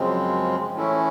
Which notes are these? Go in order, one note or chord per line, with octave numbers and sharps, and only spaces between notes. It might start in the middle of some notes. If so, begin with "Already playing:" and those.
Already playing: F#2 C#3 F3 G#3 C4
A2 E3 A3 C#4 E4